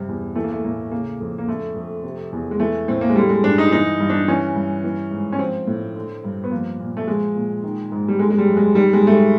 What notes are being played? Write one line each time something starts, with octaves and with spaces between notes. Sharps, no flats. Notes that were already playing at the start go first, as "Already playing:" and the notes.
Already playing: G2 C3
E2
E3 A3
A#3
A3
A2 A#3
C#3 A#3
F2
A#3
D3 A3
F2
C3
E2
G#3
E3 A3
A2 C4
A#3
G#3
D3 G3
G#3
G2 D4
D#4
E3 D#4
G2
D4
E3 C#4
G2
E3
G#2
C#4
F3 C4
A2
D3
G2
B3
F3 A#3
A#2
A3
F3 G#3
A#2
D#3
G#2
G3
D3 G#3
G#3
G3
F#2
G#3
D#3 G3
G#3
G#2 A3
G#3